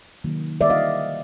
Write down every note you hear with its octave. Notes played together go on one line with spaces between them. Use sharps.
C3 D#3 F#3 A#3
D3 G3 A#3 D5 E5
D#5 F5